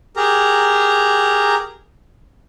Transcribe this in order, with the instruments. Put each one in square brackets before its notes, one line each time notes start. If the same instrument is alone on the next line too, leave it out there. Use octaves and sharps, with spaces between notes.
[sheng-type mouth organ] G4 G#4 A#4 A#5